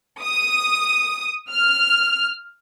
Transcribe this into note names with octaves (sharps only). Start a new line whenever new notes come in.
D#6
F6